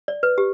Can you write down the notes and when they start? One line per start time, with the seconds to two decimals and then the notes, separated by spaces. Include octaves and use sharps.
0.08 D5
0.23 B4
0.38 G4